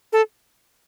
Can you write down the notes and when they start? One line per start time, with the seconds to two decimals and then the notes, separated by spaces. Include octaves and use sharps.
0.13 A4